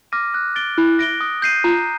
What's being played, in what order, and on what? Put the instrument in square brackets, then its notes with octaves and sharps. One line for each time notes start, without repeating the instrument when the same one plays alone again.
[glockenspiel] D6 F6 A#6 D#7
F#6
A6 D7 G7
[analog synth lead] E4 [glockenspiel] F#6
[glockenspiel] A#6 D7 G7
D#6
G6 C7 D#7
[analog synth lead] F4 [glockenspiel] A#5